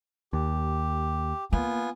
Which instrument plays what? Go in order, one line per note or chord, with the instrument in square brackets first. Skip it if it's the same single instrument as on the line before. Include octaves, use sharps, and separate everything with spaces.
[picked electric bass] D#2 [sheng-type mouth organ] G4
[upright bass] A#3 [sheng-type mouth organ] B3 F4 G#5